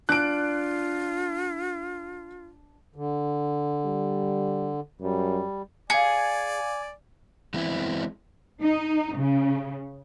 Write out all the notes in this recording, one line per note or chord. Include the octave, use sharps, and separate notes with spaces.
D4 F4 F#6 D7
D3
G3
F#2 G3
G#4 D5 F5 G#5 C#7
E3 G#3 B3 C4 E4
D#4
C#3